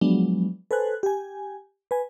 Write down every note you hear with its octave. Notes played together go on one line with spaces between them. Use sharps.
F3 F#3 G#3 B3 D4
A4 B4 C5 G#5 F#6
G4 G#5
B4 G#5